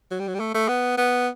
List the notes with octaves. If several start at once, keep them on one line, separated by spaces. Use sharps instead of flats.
F#3
G3
F#3
G3
A3
A3
B3
B3